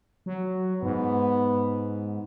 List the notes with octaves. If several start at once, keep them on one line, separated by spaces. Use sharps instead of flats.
F#3
G#2 B3